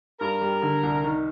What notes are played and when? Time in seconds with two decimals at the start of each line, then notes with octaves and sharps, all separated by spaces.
0.20 G2 A#4
0.41 G3
0.62 D3
0.83 C2
1.04 D#3